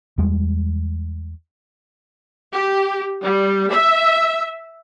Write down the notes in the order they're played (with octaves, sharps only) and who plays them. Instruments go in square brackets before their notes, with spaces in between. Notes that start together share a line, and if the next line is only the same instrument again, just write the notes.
[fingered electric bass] E2 G3 G#3
[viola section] G4
G3
E5